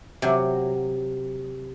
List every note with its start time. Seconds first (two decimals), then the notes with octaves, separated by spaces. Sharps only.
0.22 C3 F#3